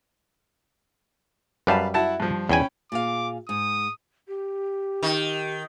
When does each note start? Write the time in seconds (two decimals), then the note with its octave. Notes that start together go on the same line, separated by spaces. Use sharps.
1.67 F#2 G3 B4 F5 A5
1.94 E4 F#4 A5
2.20 G2 F3
2.49 E2 C#4 G5 G#5 B5
2.92 A#2 G#4 F5 D6
3.49 G#2 D#6
4.28 G4
5.03 D#3